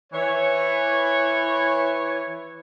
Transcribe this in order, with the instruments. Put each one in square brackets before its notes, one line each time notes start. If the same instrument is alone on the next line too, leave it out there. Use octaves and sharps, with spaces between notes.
[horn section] E3 C#5